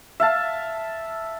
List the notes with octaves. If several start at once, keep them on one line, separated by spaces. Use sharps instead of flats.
E5 F5 A5